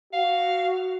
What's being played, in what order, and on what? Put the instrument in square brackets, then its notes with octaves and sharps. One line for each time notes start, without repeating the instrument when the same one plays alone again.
[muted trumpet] F#4 [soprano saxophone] F5